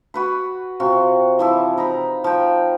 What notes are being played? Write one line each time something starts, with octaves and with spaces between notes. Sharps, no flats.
F#4 B4 B5
C3 F4 F#4 G5
E3 F3 E4
D#4 A#5 B5
F3 G5